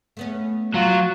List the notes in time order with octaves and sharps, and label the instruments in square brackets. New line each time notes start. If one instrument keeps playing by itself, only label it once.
[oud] A3 B3 C#4
[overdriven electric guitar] F#3 [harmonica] F4 [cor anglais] F#4